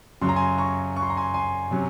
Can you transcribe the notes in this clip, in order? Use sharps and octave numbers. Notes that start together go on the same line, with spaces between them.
F#2 C#3 F#3 C6
A#5
G#5 C6
A#5 C#6
C#6
C6
A#5
G#5 C6
G#5 C6
C3 F#3 C#4